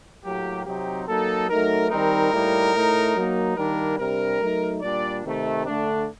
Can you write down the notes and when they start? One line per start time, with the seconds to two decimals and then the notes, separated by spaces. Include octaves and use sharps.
0.24 A2 F#3 A#3 G4
0.65 C3 F#3 C4 D#4 G4
1.07 F#3 A#3 D#4 A4
1.49 F#3 A3 D#4 A#4
1.90 D#3 G3 C4 D#4 A#4
2.32 A2 G3 A#3 D#4
2.74 A2 A3 D#4
3.15 F#3 A#3 D#4
3.57 D#3 G3 A#3 D4 A#4
3.99 C3 G3 D4 A#4
4.40 F#3 A3 D#4
4.82 A#2 G3 D4 D5
5.24 C3 D#3 A3
5.65 D3 A3 D4